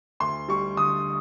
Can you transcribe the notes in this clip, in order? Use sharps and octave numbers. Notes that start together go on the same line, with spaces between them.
D2 C6
G3 C#6
D3 D#6